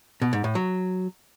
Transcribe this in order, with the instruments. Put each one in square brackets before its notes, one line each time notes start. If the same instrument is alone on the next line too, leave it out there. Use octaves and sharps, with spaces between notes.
[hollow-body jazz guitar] B2
G#2
A2
F#3